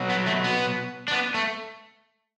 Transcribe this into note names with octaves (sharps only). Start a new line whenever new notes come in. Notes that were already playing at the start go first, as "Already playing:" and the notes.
Already playing: B2 F#3
B3
A3
B3
D4
B3
A3